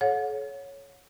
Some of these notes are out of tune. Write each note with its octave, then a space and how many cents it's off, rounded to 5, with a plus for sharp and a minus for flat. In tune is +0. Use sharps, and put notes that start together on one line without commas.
A4 -45 C#5 +0 F#5 -40